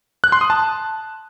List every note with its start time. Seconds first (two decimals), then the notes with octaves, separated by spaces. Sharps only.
0.24 F#6
0.32 C6
0.41 D#6
0.50 A5